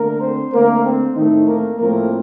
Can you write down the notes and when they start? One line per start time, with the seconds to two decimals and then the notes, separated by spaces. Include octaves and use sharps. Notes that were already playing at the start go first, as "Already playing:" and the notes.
Already playing: D3 A3 A#3 A#4
0.21 C4 C5
0.53 D3 A3 A#3 C4 A#4
0.85 C4
1.16 A2 D#3 A3 C4 D#4
1.47 A#3 A#4
1.79 A2 F3 A3 A#3 C4 A#4